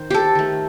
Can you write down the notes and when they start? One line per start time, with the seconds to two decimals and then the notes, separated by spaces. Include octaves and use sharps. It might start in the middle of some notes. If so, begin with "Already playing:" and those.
Already playing: D#3 C5
0.10 G4 A4
0.35 D#3 A3